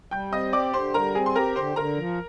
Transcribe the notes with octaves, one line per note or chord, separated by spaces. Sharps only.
G3 G5 G6
C4 D#5 D#6
G4 D5 D6
D3 C5 C6
G3 A#4 A#5
C4 G#4 G#5
C6
G4 A#4 A#5
D3 C5 C6
D3 A#4 A#5
F3